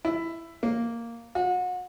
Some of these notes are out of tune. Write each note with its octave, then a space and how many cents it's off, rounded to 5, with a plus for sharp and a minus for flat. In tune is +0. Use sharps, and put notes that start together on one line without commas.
E4 +10
A#3 -5
F#4 -35